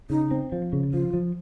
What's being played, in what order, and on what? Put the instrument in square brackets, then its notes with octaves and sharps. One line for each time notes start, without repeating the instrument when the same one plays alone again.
[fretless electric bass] C#3 [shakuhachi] D#4
[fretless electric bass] C4
F3
C#3
[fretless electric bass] F3 [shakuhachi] F4
[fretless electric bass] F3